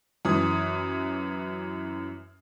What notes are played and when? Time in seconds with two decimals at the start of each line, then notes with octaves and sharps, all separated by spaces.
0.25 F#2 E3 D#6